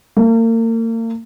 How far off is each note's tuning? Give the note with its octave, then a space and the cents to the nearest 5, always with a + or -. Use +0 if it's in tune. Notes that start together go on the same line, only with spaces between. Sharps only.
A#3 -40